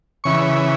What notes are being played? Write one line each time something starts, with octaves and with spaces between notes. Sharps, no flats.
C#3 E3 C#6